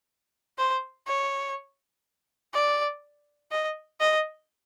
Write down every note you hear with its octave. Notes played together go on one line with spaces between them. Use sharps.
C5
C#5
D5
D#5
D#5